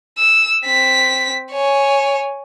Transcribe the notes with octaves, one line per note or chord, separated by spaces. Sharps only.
E6
C4 B6
C#5 G#5